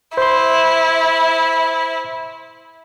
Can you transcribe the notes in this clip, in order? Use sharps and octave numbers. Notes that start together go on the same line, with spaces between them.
E4 C5 C6